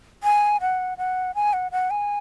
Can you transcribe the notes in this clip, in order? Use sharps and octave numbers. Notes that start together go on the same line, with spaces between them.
G#5
F#5
F#5
G#5
F#5
F#5
G#5